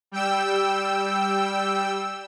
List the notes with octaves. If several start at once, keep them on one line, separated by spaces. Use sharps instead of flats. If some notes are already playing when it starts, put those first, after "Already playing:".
G3 G5 E6